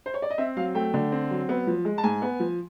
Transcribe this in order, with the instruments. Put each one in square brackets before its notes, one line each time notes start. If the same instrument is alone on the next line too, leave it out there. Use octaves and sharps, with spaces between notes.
[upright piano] C5
C#5
D5
D#5
C4 E5
F#3 F5
A3 G5
D3
C4
F#3
B3
F3
G#3
A5
G#2 G#5
B3
F3